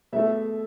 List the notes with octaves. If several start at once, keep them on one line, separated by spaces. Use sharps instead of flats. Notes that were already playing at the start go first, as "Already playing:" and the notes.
B2 A3 E5